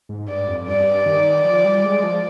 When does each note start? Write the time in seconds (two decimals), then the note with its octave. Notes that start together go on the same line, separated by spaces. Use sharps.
0.09 G#2
0.28 G2 D5
0.48 F2
0.67 G2 D5
1.06 D#3
1.45 F3
1.65 G3
1.83 G#3
2.03 F3